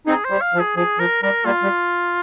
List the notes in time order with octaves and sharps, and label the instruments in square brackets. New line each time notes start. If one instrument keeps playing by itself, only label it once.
[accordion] C4 D#4 [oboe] G#4
[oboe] C5
[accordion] G3
[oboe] F5
[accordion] F3
[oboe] G#4
[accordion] F3 [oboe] G#4
[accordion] F3 [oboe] A#4
[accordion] G3 [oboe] A#4
[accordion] G3 A#3 [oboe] F4
[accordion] G3